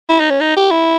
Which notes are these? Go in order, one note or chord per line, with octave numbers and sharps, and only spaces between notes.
E4
D#4
C#4
D#4
G4
E4